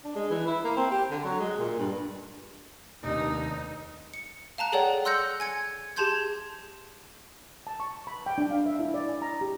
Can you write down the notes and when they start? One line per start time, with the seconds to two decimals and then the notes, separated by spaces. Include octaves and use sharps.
0.05 D4
0.16 G#3
0.31 E3
0.47 E4
0.64 A#3
0.77 C4
0.91 G4
1.11 D3
1.24 F#3
1.40 G#3
1.59 A#2
1.78 G2
3.03 F1 D#2 D4 D#4
4.14 C#7
4.58 F5 A5 A#5 F#6
4.72 G#4 A4 C#5 D5 F#5 G5
5.05 C6 E6 F#6 G6 A#6 C#7
5.40 G#5 G#6 C#7
5.96 G4 G#4 A5 C6 G6 G#6
7.67 A5
7.80 C#6
8.07 B5
8.26 G5
8.38 D4
8.51 F5
8.66 E5
8.79 E4
8.94 D5
9.09 G#5
9.22 A#5
9.41 G4